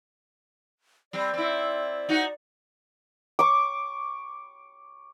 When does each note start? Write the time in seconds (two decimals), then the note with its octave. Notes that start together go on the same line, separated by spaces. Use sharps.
1.13 G3 C4 D5
1.34 C4 E4
2.09 D#4 F#4
3.39 C#6 D6